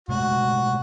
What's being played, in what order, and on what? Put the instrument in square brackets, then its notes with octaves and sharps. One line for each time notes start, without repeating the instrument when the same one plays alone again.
[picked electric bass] B2 G#3 A3 [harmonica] F#4